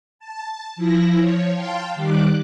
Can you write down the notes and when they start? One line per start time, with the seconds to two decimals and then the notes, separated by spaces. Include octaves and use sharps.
0.19 A5
0.76 F3 E4 A#6
1.19 F3 C#5
1.54 F5 G5 A5 C6
1.95 D#3 G3 D6 F#6